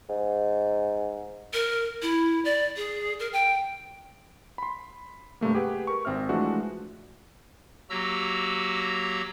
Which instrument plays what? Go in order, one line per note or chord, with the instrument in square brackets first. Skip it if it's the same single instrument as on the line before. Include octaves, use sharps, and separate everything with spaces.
[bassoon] G#2
[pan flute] A#4
E4
D5
G#4
A#4
G5
[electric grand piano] B5 C6
G2 C3 A3 A#3
G4 G#4 B4 F#5
A#4 C#6
G#1 C4 E5 F6
E3 F3 G#3 A3 D4 F#4
[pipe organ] F#3 A#3 F#4 G4 A#5 E6